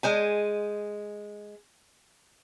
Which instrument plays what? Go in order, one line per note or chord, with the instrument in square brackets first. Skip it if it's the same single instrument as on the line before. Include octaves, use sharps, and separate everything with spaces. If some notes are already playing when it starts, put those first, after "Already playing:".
[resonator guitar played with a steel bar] G#3 C5 G#5